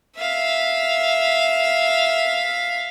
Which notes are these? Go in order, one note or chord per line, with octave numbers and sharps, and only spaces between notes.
E5 F5